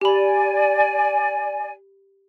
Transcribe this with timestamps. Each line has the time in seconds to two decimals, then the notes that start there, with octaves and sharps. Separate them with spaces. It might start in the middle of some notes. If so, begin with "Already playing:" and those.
0.01 G4 D5 G#5 B5